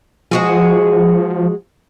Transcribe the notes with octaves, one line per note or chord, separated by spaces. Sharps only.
F3 G#3 F#4 G#4